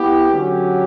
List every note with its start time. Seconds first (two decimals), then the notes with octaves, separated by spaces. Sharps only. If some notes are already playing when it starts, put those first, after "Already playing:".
Already playing: B3 E4 G4
0.31 D3 F#3 C#4 G4